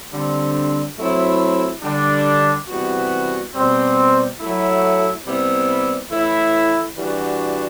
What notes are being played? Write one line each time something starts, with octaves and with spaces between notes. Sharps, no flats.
D3 G3 C4
F#3 A3 C4 E4
D3 G3 D4
C3 E3 G3 B3 F#4
B2 G3 C4
F#3 A3 E4
C3 G3 B3 E4
A2 E3 A3 E4
E3 G3 D4 F#4